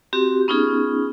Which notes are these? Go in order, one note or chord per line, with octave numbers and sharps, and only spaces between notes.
C4 F#4 G4
B3 C#4 D#4 F4 G#4